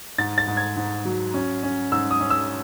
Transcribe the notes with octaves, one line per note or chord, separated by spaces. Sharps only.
G#2 A6
A6
G#2
G#6
G#2
F#3
C#4
C#4
G#2 E6
D#6
C#4
E6